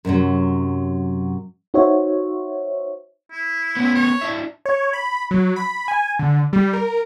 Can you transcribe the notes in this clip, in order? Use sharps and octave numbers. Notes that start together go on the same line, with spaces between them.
F#2 C3 E3 F#3
D#4 F#4 C5 C#5 E5
E4
B3 C#4
C#5
D4 E4 E5
C#5
B5
F#3
B5
G#5
D3
G3
A#4